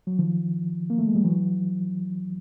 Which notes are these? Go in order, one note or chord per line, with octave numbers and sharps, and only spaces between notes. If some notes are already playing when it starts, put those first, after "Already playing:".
F#3
D#3 F3
A#3
A3
G#3
G3
E3 F#3